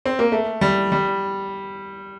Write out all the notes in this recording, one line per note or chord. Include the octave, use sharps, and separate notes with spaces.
C4
A#3
A3
G3
G3